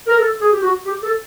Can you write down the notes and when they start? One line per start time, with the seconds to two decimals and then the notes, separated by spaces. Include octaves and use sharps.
0.07 A#4
0.19 A4
0.40 G#4
0.52 G4
0.63 F#4
0.86 G4
1.03 A4